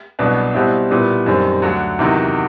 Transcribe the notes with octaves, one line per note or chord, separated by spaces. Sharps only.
C2 B2 F#3 B3 D4
B2 G3 C4 E4
A#2 G3 B3 E4
F#2 D#3 G3 C4
D2 D3 F#3
E2 C3 D#3 F#3